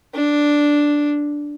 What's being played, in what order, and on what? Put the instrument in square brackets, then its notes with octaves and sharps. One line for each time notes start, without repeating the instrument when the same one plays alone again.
[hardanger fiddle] D4